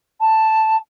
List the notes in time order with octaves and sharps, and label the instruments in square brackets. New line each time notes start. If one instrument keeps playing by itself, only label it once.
[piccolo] A5